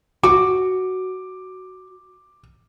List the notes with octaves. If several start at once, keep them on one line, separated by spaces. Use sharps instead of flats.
F#4 D6